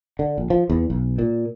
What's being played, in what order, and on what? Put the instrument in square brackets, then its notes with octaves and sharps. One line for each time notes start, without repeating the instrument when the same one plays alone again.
[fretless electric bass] D3
A#1
F3
E2
B1
A#2